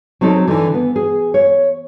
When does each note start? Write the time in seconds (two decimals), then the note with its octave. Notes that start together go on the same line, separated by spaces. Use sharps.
0.21 F#3 C4 D#4 A4
0.48 D3 E3
0.74 B3
0.96 G#4
1.34 C#5